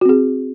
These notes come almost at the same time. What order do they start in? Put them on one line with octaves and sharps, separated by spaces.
F#4 C4 G#4